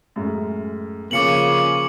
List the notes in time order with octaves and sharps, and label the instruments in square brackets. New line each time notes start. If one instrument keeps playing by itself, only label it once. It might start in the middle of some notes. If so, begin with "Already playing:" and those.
[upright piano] F#2 A2 G#3
[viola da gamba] C#3 F3 C#4 [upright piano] A#3 F4 [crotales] D6 C#7 F#7